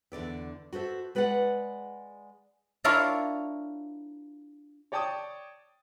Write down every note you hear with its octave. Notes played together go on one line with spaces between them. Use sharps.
E2 D3 D5 E5
F#4 A4 C5 E5
G#3 B4 D5 E5 F#5
D4 E4 F4 A#4 C#5 F5
C#5 D5 G5 A5 D#6